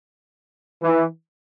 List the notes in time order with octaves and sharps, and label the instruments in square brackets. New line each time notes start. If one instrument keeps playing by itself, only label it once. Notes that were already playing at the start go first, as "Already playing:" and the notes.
[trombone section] E3